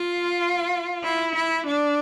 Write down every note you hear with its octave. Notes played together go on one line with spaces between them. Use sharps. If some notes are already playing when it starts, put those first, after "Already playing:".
Already playing: F4
E4
E4
D4